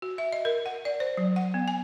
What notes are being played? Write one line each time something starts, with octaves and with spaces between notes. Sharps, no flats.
F#4
E5
D#5
A#4
F#5
D5
C5
F#3
F#5
B3
G#5